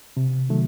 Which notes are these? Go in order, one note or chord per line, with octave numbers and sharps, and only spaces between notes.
C3
D#3 F#3 A3